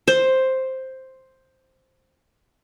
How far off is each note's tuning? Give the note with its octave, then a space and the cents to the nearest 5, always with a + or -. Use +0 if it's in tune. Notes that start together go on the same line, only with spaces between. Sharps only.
C5 +5